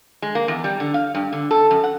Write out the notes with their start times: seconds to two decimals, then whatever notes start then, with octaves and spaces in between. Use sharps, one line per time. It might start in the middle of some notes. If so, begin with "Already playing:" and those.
0.22 G#3
0.35 A#3
0.48 E2
0.64 G3
0.80 D3
0.94 F5
1.15 G2
1.33 D3
1.51 A4
1.71 F#2
1.84 F#5